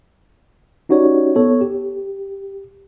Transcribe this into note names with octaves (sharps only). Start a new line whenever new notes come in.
C#4 D#4 F#4 G4 C#5 D5
B3 A4 C#5
G4